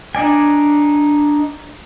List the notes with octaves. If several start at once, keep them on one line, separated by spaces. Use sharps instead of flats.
D4 D#4 D5 G#5